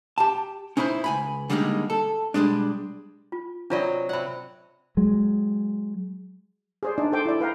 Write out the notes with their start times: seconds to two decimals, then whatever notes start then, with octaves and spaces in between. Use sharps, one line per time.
0.18 G4 A5
0.77 C#4 D#4 E4 B4 C5
1.04 C#2 G#5 B5
1.50 D3 G3 G#3 A#3 D4 D#4
1.90 A4
2.34 B1 G2 G3 G#3 D4
3.32 F4
3.70 C3 F#3 D4 F4 D5 D#5
4.09 C3 D5 F#5 B5
4.97 F#3 G#3
6.83 G#4 C5 D5
6.98 D4 D#4 D5
7.12 A4 C5 G5 D6
7.25 E4 D5
7.41 B4 F5 G5 A#5